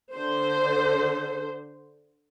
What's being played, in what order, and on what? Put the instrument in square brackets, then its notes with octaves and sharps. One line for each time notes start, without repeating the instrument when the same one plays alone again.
[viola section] D3 C5